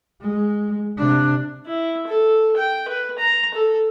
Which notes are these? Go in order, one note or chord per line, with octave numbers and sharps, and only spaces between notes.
G#3
C3 D4
E4
A4
G5
B4
A#5
A4